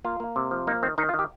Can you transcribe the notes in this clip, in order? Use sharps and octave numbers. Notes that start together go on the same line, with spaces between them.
A#3 F4
A#3
C3
F3
A#3 D#4
D#3 C4
D#3 D#4
F4
D#3
G4